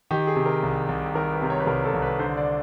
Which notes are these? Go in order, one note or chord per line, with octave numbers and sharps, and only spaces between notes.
D#3 G4
G#4
C3
A#4
C2
C2
D#3 A#4
B4
C3
C#5
B4
C2 A#4
A4
C2
B4
D3 C5
D5